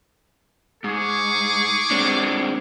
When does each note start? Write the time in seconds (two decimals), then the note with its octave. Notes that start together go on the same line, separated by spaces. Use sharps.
0.84 G#2 G#4 C#6 D6
1.91 G#3 C4 D4